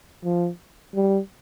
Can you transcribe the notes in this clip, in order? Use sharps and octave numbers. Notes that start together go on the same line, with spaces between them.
F3
G3